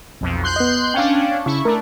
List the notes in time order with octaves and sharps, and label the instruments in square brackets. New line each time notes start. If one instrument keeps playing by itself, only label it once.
[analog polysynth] B1 F2
C6 F#6 G6
[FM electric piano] B3 D#5
[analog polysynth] C#4 D4 [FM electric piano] F5 G5
[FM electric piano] C#3 [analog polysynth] E4 C#6
[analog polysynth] A3 D4 [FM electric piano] A#4